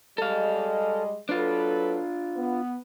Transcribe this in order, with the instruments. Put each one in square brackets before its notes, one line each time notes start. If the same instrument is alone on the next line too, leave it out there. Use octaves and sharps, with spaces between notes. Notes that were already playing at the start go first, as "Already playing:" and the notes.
[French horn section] G3 G#3 D#5 [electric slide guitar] A4 F5
[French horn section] F#3 A4 B4 [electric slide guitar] D4 F4
[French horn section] B3